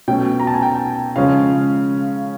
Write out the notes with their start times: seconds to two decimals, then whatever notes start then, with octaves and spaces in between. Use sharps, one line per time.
0.08 B2 F#3 A3 C#4 G5
0.40 A#5
0.47 A5
0.54 G#5
0.62 G5
1.16 C#3 F3 G#3 C#4 F5